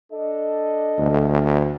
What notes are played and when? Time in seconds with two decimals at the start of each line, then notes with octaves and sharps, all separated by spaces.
0.13 D4 A4 D#5
0.98 D2